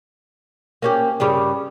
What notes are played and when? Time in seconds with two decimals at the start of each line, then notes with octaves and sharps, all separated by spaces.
0.82 A#3 C#4 G4
1.20 G2 C#3 G3